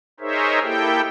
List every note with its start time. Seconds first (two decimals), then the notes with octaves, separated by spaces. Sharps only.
0.20 D#4 G#4 A#4 C5 C#5 E5
0.62 A#3 E4 G4 A4 G5